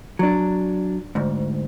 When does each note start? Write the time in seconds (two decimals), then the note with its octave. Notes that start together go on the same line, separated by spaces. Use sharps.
0.19 F#3 D4
1.15 D2 G#2